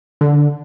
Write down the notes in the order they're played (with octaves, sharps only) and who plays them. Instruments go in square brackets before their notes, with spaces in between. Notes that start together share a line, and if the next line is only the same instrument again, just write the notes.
[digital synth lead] D3